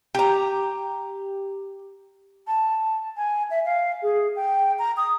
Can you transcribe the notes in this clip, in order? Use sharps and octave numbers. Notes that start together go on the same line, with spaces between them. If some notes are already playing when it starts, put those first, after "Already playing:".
G4 A#5
A5
G#5
E5
F5
G#4
G5
A#5
D#6